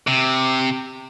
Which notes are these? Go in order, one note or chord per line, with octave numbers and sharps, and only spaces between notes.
C3